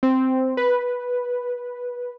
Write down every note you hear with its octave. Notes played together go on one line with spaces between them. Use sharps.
C4
B4